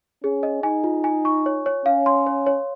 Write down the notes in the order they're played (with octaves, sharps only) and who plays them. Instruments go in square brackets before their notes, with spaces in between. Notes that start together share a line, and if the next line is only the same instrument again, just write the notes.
[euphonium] C#4 [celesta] G#4
[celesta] D#5
[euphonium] D#4 [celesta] G#5
[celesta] F4
G#5
C#6
C#5
C#5
[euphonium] C#4 [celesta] F5
[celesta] C6
C#5
C#5